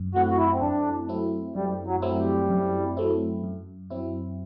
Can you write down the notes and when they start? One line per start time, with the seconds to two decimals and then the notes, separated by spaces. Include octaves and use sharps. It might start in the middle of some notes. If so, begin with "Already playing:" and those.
Already playing: F#2
0.14 F#3 A3 C4 E4 F#4
0.31 F#4
0.38 E4
0.53 C4
0.61 F#2 D4
1.09 F#3 A3 C4 E4
1.55 F#2 G3
1.87 F#3
2.02 F#3 A3 C4 E4
2.19 G3
2.50 F#2
2.97 F#3 A3 C4 E4
3.44 F#2
3.90 F#3 C4 E4